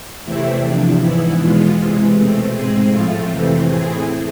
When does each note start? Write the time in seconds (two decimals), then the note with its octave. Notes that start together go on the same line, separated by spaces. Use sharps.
0.25 E2 C3 E3 A3 C4 E4
0.62 E2 C3 F3 D4
1.00 G#2 E3 B3 E4
1.39 E2 B2 G#3 B3 F4
1.77 C3 E3 G#3
2.15 B2 A3 C4
2.54 G#2 G#3 C4 G#4
2.92 A2 F3 A3 C4 F4
3.29 F2 C3 E3 A3 C4
3.67 A2 E3 A3 C4 G#4